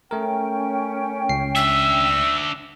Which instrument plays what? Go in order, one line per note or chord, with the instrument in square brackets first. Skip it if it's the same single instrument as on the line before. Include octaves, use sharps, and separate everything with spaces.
[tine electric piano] A3 A#4 [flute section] C#4 G5
[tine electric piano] C#2 C7
[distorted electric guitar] D4 E5 [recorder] E6